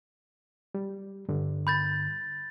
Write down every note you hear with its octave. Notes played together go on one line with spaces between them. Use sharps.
G3
G2 D3
B5 G6 A6